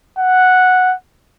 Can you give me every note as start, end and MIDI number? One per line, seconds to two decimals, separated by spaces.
0.19 0.94 78